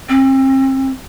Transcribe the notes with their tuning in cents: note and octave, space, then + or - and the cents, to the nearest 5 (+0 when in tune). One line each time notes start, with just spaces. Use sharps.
C4 +35